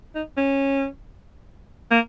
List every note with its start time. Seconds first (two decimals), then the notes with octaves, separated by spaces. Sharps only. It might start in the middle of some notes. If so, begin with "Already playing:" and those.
0.15 D#4
0.37 C#4
1.91 A#3